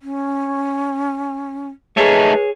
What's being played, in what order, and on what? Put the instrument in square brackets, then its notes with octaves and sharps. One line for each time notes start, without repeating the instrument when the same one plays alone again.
[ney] C#4
[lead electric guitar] A3 D#4 [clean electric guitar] G#4 C#5 [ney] B4